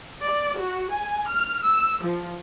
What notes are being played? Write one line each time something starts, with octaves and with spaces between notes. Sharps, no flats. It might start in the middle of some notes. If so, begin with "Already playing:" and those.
D5
F#4
G#5
F6
E6
F3